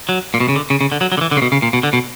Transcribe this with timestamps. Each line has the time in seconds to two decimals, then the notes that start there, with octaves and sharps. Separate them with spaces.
0.09 F#3
0.34 A#2
0.40 B2
0.49 C#3
0.56 D3
0.70 C#3
0.81 C#3
0.92 D3
1.01 F#3
1.12 F#3
1.17 D3
1.21 E3
1.31 D3
1.37 C#3
1.42 B2
1.52 C#3
1.62 A#2
1.73 B2
1.83 D3
1.93 B2